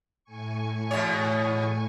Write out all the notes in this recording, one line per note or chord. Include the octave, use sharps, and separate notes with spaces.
A2 G#5 C#6
E2 B2 C#5